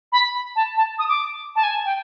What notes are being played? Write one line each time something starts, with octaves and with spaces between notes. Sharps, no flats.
B5
A5
A5
D#6
D6
A5
G#5
G5